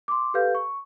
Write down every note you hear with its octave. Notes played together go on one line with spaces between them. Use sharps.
C6 D6
G4 A4 B4 F5 G6
C#6